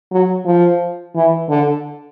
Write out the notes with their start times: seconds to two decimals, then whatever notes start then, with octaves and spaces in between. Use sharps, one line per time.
0.12 F#3
0.46 F3
1.15 E3
1.50 D3